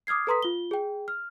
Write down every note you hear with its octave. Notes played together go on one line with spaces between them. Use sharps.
D6 D#6 F6 G#6 C7
A4 B4 A#5 C6 D#6 B6
F4 G7
G#4 G5
F6